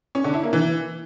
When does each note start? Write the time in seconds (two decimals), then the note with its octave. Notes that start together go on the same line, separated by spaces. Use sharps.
0.15 C#4
0.24 D3
0.34 E4
0.43 A#3
0.53 E3